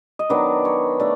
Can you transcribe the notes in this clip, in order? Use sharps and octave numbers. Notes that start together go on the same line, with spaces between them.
D#5
D#3 F#3 B3 D4 D5
C#5
A3 D4 D5